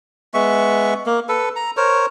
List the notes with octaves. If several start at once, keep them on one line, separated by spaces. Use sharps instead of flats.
G#3 B3 E5 C#6
A#3
A4 B4
A#5
A#4 C5 C#5